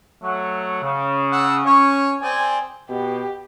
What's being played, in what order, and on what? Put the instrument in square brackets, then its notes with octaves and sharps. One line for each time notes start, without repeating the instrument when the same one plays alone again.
[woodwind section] F#3 A3 F#5
C#3
[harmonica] F#5 E6
[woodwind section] C#4 [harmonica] C#5
[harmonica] C4 G#4 D5 [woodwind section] G#5
[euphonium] B2 [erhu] G4